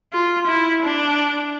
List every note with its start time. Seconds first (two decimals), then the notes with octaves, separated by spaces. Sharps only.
0.13 F4
0.47 E4
0.83 D4